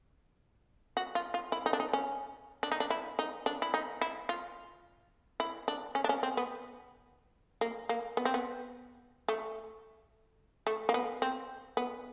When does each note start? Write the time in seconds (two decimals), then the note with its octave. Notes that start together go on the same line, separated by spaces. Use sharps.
0.97 F#4
1.15 F4
1.34 F4
1.52 E4
1.66 D#4
1.73 D4
1.80 D#4
1.93 C#4
2.63 D4
2.72 D#4
2.80 D4
2.90 E4
3.19 D#4
3.46 D4
3.62 E4
3.74 D#4
4.02 E4
4.29 F4
5.40 E4
5.68 D4
5.95 C#4
6.04 D4
6.09 C#4
6.23 C4
6.37 B3
7.61 A#3
7.89 A#3
8.17 B3
8.25 C4
8.34 B3
9.29 A3
10.67 A3
10.89 A#3
10.94 B3
11.22 C4
11.77 B3